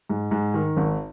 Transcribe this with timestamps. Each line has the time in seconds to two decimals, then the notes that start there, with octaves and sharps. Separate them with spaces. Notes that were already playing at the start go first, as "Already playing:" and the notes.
0.09 G#2
0.31 G#2
0.54 D#3
0.77 G#1